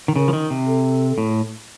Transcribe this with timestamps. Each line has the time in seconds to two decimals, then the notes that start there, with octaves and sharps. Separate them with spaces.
0.08 D#3
0.16 C#3 A#4
0.28 F3
0.33 D#3
0.50 C3
0.67 A4
1.18 A2